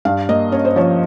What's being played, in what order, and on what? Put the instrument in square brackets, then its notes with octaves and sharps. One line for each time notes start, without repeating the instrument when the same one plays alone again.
[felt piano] G2 F5
A#3 D#5
C#4 C#5
C5
F3 C#5